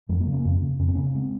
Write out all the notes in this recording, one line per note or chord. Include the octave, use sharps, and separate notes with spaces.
F2 F3 G#3
F#3 A#3
C#3
A#3 C#4
F2
C#3
F2 C#4
C4
A#3 C#4
C#3
C#4
G#3 C4